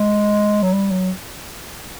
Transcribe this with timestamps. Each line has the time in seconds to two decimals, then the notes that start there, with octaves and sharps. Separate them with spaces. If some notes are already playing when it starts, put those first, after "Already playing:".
Already playing: G#3
0.63 F#3
0.73 G3
0.91 F#3